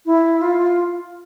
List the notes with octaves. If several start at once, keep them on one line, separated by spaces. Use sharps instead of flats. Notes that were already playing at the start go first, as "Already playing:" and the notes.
E4
F4